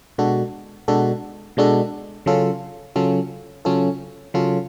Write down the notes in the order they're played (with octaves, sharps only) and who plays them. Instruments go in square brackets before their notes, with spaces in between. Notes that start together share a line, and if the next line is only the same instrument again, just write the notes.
[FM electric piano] B2 G#3 D4 F#4 A4
B2 G#3 D4 F#4 A4
B2 G#3 D4 F#4 A4
C#3 F#3 C#4 F4 A4
C#3 F#3 C#4 F4 A4
C#3 F#3 C#4 F4 A4
C#3 F#3 C#4 F4 A4